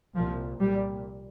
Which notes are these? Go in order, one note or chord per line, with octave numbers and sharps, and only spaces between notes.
C2 A#2 F3
C2 A#2 G3